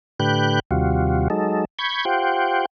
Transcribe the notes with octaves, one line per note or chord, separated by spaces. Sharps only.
A2 D3 G4 B4 F#6 G6
D#2 C3 G3 F4 F#4
F#3 G#3 D#4 A4
B5 C#6 G6 G#6
F4 G4 C5 F#5 G5